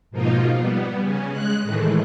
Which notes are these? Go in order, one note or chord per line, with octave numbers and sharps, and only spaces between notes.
G#2 B2 F3 A#3 D#4 F4
G3 B3
C#3 C#4
G#3 F#6
A2 D#3 E3 G#3 A3